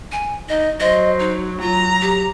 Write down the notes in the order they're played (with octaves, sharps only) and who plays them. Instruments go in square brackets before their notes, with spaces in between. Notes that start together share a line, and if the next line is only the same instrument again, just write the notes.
[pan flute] G#5
[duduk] D#4 [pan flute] D#5
[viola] F#3 [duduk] C5 [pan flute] D#5
[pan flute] D#4
[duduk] F#3 [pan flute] F4 [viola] A#5
[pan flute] G4